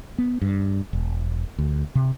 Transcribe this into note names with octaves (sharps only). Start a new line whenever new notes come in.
B3
G2
E1
D2
C3